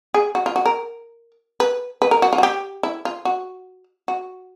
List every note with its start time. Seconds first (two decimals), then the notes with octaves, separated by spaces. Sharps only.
0.14 G#4
0.35 F#4
0.46 F4
0.56 F#4
0.66 A#4
1.60 B4
2.02 B4
2.11 A#4
2.22 F#4
2.33 F4
2.38 F#4
2.43 G4
2.83 E4
3.05 F4
3.25 F#4
4.08 F#4